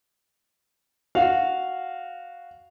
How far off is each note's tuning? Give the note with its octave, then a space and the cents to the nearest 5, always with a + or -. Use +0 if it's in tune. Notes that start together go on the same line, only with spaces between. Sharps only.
F#4 +0 F5 +0